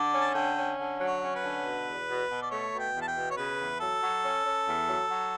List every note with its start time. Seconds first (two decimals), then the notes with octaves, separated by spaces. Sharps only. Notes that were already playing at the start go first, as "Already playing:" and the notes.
Already playing: D3 D5
0.13 C#4
0.21 A5
0.35 D3 G5
0.56 C#4
0.78 D3
1.00 F#3
1.07 C#5
1.21 C#4
1.36 B4
1.42 D3
1.64 B2
1.86 E2
2.08 B2
2.29 B2
2.42 D5
2.50 A3 C#5
2.72 B2
2.79 G5
2.94 E2
3.02 A5
3.08 G5
3.15 B2
3.31 C#5
3.37 C#3 B4
3.58 E2
3.80 F#3 A4
4.01 F#3
4.23 C#4
4.44 C#4
4.66 E2
4.88 F#3
5.09 F#3